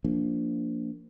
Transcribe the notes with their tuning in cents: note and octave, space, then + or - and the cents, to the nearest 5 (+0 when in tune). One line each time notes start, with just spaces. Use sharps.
F3 -20 A#3 -15 D4 -20